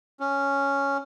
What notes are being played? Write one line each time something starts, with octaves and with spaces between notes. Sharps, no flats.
C#4